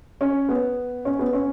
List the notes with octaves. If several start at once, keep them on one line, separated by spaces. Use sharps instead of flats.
C#4
B3
C#4
B3
C#4